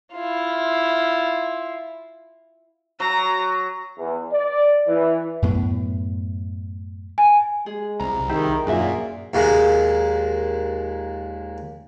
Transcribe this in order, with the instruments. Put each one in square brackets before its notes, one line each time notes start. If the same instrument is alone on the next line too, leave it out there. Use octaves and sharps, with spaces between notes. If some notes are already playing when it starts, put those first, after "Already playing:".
[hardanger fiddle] E4 F4
[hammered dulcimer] F#3 [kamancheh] A#5
[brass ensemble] E2
D5
E3
[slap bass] F#2 A2 B3
[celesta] G#5
[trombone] G#3 [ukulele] G#4
[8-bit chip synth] C2 [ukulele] A#5
[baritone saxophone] D#3 [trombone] D#4 [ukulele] E4 G4 G#4
[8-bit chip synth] F#2 [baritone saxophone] A#2 [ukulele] D4 F#4 E5 [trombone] G#4
[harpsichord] D#2 A#2 G#3